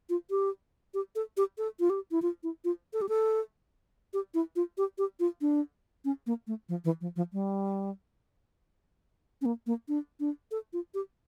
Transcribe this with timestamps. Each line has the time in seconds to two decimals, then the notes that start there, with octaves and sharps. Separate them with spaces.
0.10 F4
0.30 G4
0.94 G4
1.15 A4
1.37 G4
1.58 A4
1.80 F4
1.90 G4
2.11 E4
2.22 F4
2.43 E4
2.65 F4
2.93 A4
3.02 G4
3.09 A4
4.13 G4
4.34 E4
4.56 F4
4.78 G4
4.98 G4
5.20 F4
5.41 D4
6.05 C#4
6.27 A#3
6.47 A3
6.69 F3
6.85 E3
7.01 F3
7.16 F3
7.33 G3
9.41 C#4
9.46 A#3
9.67 A#3
9.88 D4
10.20 D4
10.51 A4
10.73 F4
10.94 G4